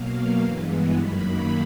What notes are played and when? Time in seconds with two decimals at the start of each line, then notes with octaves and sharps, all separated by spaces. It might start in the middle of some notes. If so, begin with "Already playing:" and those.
Already playing: B2 F#3 A#3 F5
0.42 G2 E3 G#3 B3
0.96 F#2 D#3 F#3 A#3 B5